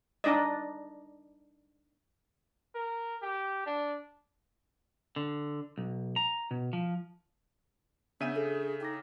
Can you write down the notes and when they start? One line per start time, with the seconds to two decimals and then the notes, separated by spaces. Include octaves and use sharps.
0.24 D4 D#4 D5 D#5
2.75 A#4
3.22 G4
3.66 D4
5.16 D3
5.78 B1
6.16 A#5
6.51 B2
6.73 F3
8.21 C#3 B3 D4 E5 G#5 G6 D#7
8.36 G#4 A4
8.81 D#4 G5 D6 A#6